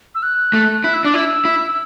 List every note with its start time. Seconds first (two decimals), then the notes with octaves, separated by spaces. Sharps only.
0.15 E6
0.23 F#6
0.53 A3
0.84 E4 F#6
0.94 E6
1.05 D4 D6
1.14 E4 E6
1.45 E4